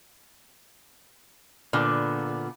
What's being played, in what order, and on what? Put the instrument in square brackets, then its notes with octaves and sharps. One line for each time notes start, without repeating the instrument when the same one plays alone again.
[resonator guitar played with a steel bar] A#2 D3 B3